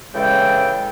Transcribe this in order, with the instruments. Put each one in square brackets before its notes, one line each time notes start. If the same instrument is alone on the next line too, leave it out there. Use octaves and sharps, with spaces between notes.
[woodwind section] C#3 E3 G#3 A4 G5